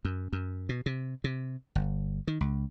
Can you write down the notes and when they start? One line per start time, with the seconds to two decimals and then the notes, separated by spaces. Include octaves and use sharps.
0.05 F#2
0.33 F#2
0.69 B2
0.86 C3
1.24 C3
1.75 G1
2.27 D#3
2.41 C#2